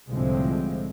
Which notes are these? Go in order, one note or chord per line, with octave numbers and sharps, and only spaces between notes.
C2 A2 D3 F3 G#3 C4